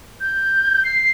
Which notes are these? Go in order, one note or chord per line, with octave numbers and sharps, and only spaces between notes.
G6
C7